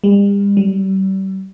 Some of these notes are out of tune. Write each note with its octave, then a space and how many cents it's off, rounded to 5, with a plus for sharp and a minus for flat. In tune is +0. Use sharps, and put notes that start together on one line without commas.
G3 +40
G3 -35